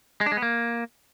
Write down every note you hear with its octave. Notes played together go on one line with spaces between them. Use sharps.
G#3
D4
G#3
B3
A#3